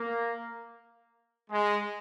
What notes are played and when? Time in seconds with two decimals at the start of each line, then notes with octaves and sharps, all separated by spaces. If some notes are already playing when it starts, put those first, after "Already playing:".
Already playing: A#3
1.50 G#3